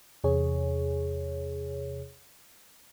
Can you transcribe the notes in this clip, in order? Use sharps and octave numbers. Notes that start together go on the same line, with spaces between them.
E2 C3 G#4 C#5